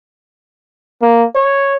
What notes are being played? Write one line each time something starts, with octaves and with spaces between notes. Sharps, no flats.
A#3
C#5